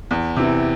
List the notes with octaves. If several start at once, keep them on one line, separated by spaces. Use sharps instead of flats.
E2
C3 E3